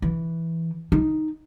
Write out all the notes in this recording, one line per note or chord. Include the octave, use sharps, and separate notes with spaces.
E3
D#4